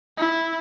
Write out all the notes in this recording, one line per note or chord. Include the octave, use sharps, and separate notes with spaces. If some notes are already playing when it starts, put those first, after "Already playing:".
E4